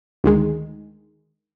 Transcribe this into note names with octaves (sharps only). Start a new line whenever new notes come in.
D2 D#3 G#3